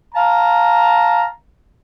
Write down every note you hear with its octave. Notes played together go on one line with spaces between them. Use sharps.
F5 A5 A#5